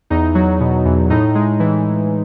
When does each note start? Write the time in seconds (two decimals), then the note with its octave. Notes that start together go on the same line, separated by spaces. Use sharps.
0.10 E2 D#4
0.35 F#3
0.60 B2
0.85 E2
1.10 A2 D#4
1.35 G#3
1.60 E3